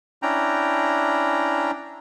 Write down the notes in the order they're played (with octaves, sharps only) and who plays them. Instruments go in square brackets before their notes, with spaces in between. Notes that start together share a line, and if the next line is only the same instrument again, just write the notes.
[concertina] C#4 D4 E4 G5 A#5